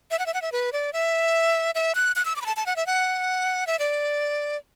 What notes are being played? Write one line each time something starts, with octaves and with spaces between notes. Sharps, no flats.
E5
F#5
E5
F#5
E5
B4
D5
E5
E5
F#6
F#6
E6
D6
B5
A5
A5
F#5
E5
F#5
E5
D5